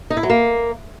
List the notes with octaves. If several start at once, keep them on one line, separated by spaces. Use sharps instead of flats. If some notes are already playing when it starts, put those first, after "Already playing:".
D#4
E4
F#3
A#3